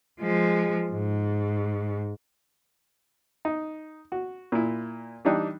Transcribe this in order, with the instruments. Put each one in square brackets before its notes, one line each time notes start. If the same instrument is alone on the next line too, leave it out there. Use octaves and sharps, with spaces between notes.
[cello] F3 G#3
G#2
[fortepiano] D#4
F#4
A#2 E4
E3 G3 D4 D#4